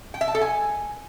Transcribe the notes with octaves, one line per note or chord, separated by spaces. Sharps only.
G5
E5
A5
A4
G#5